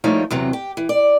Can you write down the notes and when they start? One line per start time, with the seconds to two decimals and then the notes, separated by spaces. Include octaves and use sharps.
0.04 F3 G3 A3 A#3 D#4 C#5
0.31 E2 C3 F#3 C4
0.53 G4
0.77 E3
0.89 D5